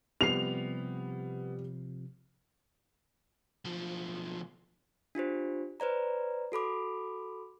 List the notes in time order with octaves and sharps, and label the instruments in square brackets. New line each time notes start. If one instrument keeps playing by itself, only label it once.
[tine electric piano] C3 F3 [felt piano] G3 C7 [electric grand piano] B3 [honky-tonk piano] F7
[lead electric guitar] B1 F3
[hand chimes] D4 F4 G4 C5
B4 C5 D5 A#5
F#4 A4 B5 D6